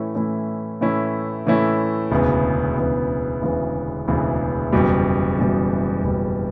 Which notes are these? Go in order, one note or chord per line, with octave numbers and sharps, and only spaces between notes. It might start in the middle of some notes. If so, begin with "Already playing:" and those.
Already playing: A2 E3 A3 C#4 E4
A2 E3 A3 C#4 E4
A2 E3 A3 C#4 E4
A2 E3 A3 C#4 E4
E1 D2 C#3 E3 B3
E1 D2 C#3 E3 B3
E1 D2 C#3 E3 B3
E1 D2 C#3 E3 B3
F#1 E2 B2 G3
F#1 E2 B2 G3
F#1 E2 B2 G3